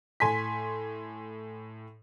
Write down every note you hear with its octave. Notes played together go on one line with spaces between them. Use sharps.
A2 G#5 C6 B6